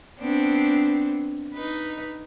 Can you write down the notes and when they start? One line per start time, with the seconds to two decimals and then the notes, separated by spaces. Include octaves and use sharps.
0.20 B3 C4 D4
1.54 D#4 B4